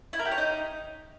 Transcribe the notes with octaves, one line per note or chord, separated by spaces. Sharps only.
E4
A#4
G4
C#5
D#4